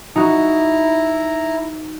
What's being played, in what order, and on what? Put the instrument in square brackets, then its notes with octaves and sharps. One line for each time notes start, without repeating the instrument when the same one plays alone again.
[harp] D#4 F#4 [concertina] E4 A#5